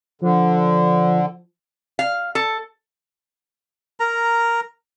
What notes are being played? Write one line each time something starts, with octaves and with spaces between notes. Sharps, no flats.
D3 F3
F5
A4
A#4 A#5